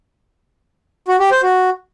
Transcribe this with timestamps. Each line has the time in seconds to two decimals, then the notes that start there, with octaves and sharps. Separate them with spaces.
1.08 F#4
1.20 G4
1.31 C5
1.43 F#4